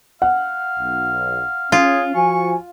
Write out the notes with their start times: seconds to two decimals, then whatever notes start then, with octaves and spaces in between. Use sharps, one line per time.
0.22 F5 F#5
0.78 B1
1.72 C#4 F4 G#4
2.15 F3 F#4 G#5 C#6